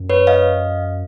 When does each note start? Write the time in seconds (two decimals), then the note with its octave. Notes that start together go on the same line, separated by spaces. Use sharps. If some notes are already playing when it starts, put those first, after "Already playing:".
Already playing: F#2
0.10 B4 C#5
0.27 D#5 F5